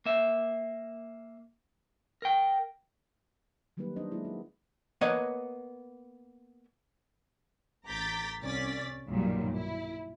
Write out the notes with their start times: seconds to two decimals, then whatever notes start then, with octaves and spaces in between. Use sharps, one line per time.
0.06 A#3 E5
2.22 A#4 G5
3.77 D#3 F#3 G3 A#3 D#4 B4
3.96 F#3 B3 D4 D#4 C5 D#5
4.11 F#3 G#3 A#3 E4 G#4
4.25 F#4
5.01 A#3 B3 C#5 D#5
7.86 A1 A#5 D6 G6 A6 B6
8.41 C2 C#4 D5 A6 B6
9.07 B1 G2 A#2 D#3 F#3 G3
9.55 E4